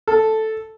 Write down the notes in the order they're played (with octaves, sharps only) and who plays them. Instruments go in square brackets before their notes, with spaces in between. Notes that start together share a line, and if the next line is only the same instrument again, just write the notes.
[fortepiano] A4